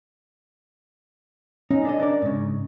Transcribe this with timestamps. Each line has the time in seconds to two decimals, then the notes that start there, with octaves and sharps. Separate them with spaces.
1.71 C#4 D#4
1.85 D4 A4 D#5
2.00 D4 A#4 D5
2.22 G#2 C#3